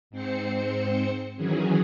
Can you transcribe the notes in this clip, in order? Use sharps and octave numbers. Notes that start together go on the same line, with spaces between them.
G#2 C4 C5 C#7
D#3 E3 F#3 C#4 G#4